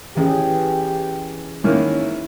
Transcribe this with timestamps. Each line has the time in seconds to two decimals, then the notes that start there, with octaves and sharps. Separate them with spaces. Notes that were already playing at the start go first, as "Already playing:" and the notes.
0.17 A1 E3 C#4 G4 G#4
1.64 G#2 D#3 A#3 C#4 E4